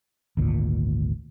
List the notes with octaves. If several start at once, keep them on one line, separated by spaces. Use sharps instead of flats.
G#1 D2 A#2